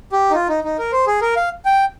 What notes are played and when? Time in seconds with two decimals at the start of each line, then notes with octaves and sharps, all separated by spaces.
0.12 G4
0.31 D#4
0.35 F4
0.48 D#4
0.64 D#4
0.78 A#4
0.92 C5
1.07 G#4
1.21 A#4
1.36 F5
1.65 G5